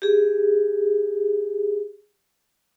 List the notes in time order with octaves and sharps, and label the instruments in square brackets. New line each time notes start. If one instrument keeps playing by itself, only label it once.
[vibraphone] G4 G#4